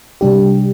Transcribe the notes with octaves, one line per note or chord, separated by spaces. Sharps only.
C3 G3 D4 G4